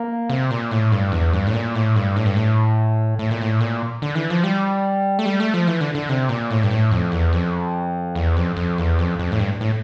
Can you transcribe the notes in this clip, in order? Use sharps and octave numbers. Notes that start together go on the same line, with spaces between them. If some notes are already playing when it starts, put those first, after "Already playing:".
Already playing: A#3
C3
A#2
A2
G2
E2
G2
A2
A#2
A2
G2
A2
G2
A2
A2
A#2
A2
A#2
D3
E3
F3
G3
A3
G3
A3
F3
E3
D3
D3
C3
A#2
A2
G2
A2
F2
E2
F2
E2
F2
F2
E2
F2
F2
A2
G2
A2